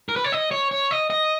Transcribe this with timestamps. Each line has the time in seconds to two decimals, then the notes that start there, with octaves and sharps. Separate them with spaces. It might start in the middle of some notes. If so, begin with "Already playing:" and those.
0.09 A#4
0.16 B4
0.24 C#5
0.32 D#5
0.51 C#5
0.71 C#5
0.91 D#5
1.10 D#5